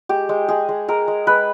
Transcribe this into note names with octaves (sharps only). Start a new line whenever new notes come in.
G#3 G4
G#3
G#3 G#4
G#3
G#3 A#4
G#3
G#3 B4